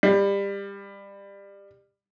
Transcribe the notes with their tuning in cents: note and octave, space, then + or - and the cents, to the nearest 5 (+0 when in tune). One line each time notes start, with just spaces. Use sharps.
G3 +25